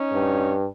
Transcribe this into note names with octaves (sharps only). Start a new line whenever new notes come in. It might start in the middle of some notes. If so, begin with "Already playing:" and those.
Already playing: C#4 D#4
G2